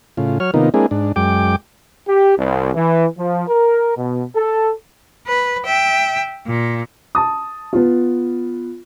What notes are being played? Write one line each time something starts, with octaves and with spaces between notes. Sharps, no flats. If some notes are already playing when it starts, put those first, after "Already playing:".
A2 C#3 F4
F#3 C#5 F6
C3 D#3 A#3 B3 D#4 F4
G#3 A#3 C4 D4 E4 G#4
G#2 D4
F#2 G#3 G5 D6
G4
C2
E3
F3
A#4
B2
A4
B4
E5 G5
A#2
A5 D#6
B3 F4